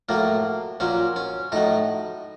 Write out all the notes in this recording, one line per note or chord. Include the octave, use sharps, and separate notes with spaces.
A2 F#3 A#3
A#2 F#3 C#4
C#4
A2 F#3 D#4